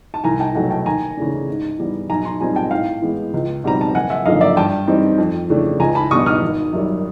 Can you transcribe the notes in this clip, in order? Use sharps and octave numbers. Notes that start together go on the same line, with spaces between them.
A5
C2 G#5 A#5
G5 A5
B2 F#3 A3 F#5 G#5
G5 A5
D#2 G#5 A#5
C#3 E3 A3 D4
G#2
E3 G3 B3
B1 G#5 A#5
A#5 C6
A#2 G3 C4 D#4 G#5 A#5
G5 A5
A2 F5 G5
E3 G#3 B3
C#2
B2 G3 C4 A#5
A5
F#1 F#5 G#5
E5 F#5
F#2 D3 F3 A#3 D#5 F5
D5 E5
G2 G5 A5
E3 G3 C4 D#4
F2
C#3 E3 A3 D4
C#2 G#5 A#5
A5 B5
B2 G3 B3 D4 C#6 D#6
D#6 F6
G#1
F#2 D#3 G3